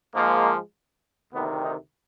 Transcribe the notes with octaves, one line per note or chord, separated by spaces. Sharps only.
G#2 F3 G#3 A#3
D2 C3 D#3 B3
D#4